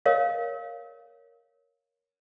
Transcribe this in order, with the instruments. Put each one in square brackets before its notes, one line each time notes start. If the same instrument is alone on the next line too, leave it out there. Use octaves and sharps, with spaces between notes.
[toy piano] A#4 C#5 D#5 F5